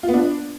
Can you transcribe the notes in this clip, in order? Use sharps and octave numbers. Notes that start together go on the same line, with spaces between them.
F4
B3
D4